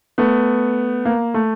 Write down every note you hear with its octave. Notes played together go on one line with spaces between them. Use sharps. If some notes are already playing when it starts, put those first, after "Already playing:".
A3 B3
A#3
A3